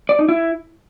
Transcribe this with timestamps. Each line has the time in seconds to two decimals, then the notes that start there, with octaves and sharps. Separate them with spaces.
0.09 D5
0.19 D#4
0.29 E4